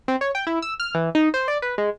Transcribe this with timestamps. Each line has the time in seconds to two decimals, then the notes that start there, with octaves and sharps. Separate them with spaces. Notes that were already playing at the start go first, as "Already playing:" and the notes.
0.08 C4
0.21 C#5
0.35 G5
0.47 E4
0.62 E6
0.80 F6
0.94 E3
1.15 D#4
1.34 C5
1.48 D5
1.62 B4
1.78 G#3